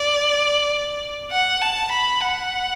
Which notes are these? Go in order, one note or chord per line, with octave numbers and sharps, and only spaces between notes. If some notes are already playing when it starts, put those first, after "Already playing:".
Already playing: D5
F#5
A5
B5
F#5